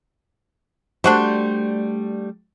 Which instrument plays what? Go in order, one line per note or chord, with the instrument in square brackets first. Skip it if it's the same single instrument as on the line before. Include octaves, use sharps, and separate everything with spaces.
[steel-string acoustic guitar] G3 A3 [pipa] D4 F#4 C5